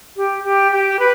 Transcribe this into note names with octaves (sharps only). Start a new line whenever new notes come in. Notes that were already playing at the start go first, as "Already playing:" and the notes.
G4
G4
G4
B4